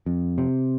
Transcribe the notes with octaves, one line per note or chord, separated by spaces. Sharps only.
F2
C3